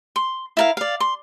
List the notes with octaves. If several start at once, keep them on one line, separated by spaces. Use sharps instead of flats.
C6
E4 A#4 F5
D5 F5
C6